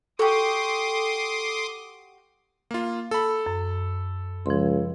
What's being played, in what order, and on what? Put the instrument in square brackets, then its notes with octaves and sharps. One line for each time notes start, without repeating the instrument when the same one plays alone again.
[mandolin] F#4 G4 [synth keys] A4 [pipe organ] C6 D6 D#6
[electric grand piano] A#3 F4
A4 B5
[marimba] F#2
[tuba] C#2 [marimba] F3 C6